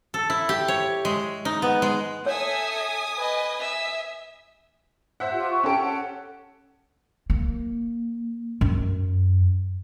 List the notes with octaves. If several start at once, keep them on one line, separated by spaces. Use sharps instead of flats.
A4
E4
G4
C#5
G#3
D#4
B3
G#3
A4 C#5 E5 G#5 D#6
B4 D#5
E5
C5 E5 F#5
F4 G4
C#6
C#4 G4 A4 G5
F#5
A#3
F#2